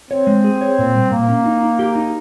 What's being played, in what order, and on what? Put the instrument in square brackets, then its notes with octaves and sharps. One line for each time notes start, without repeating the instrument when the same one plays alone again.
[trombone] C4 [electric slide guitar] C#5
[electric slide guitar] G#3
G#4
C#5
A#2
G3
[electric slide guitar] A#2 [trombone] A#3
[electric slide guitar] C#4
D#4
D#4
G4
D#4